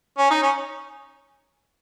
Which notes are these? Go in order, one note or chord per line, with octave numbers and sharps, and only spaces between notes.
C#4
D#4
C#4